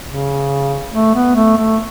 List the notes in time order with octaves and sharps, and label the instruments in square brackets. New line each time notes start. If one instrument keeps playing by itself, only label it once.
[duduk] C#3
A3
B3
A3
A3